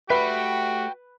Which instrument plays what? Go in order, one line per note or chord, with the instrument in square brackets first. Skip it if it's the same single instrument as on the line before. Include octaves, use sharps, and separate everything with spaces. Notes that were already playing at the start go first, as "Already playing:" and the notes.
[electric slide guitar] A3 G4 E5 [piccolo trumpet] F#4 [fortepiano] B4 [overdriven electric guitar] G5 B5